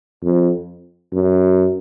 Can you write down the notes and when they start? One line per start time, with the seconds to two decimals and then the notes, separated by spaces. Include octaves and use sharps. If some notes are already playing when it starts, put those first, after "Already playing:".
0.24 F2
1.13 F#2